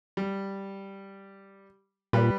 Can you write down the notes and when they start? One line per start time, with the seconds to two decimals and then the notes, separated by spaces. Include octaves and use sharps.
0.17 G3
2.13 A#2 G3 B4